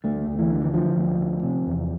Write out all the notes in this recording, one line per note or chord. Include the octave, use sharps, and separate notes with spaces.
D2 A3
D2
E3
D3
E3
D3 F3
D2
D2
C3
E2